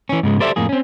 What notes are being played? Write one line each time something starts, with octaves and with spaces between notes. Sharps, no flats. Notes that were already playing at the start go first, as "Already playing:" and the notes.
E3 C#4
G#2 C#3 G#3
G4 A4 C5 D5 E5
F2 A2 A#3 G#4
C4 C#4